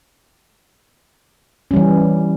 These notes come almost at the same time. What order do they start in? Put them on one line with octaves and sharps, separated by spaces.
C#4 G3 E3